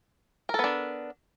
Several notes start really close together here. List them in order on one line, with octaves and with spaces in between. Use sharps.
A#4 A4 B3 D4